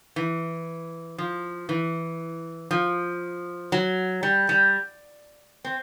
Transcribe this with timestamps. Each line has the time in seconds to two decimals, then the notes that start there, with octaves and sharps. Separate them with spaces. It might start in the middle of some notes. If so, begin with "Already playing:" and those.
0.16 E3
1.18 F3
1.69 E3
2.71 F3
3.72 F#3
4.23 G3
4.49 G3
5.64 C4